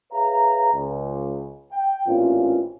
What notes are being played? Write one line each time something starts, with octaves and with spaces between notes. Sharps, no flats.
G#4 B4 C#5 E5 F5 A#5
C#2
G5
A1 A#2 E3 C4 C#4 F4